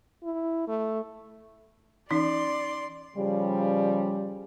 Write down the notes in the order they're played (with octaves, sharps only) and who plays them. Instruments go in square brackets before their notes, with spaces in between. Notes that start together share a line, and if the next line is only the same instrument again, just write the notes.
[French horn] E4
A3
[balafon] E3 C#4 D#4 [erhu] D5 [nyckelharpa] C6
[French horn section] C#3 F3 G3